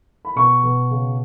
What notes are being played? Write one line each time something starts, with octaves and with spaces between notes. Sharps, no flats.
B5
B2 C#6
B2
C#3